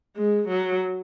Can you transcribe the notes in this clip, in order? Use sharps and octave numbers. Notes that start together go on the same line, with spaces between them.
G#3
F#3